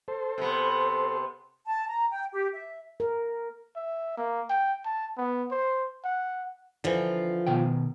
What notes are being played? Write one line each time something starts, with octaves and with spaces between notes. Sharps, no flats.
A4 C5
C3 B3
A5
A#5
G5
G4
E5
A#4
E5
A#3
G5
A5
B3
C5
F#5
D3 E3 F3 F4
B2 D#3 G5